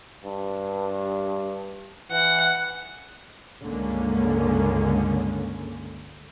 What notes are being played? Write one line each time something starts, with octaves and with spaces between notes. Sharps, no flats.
G2
E3 F#5
C#2 G2 D3 G#3 A#3 C#4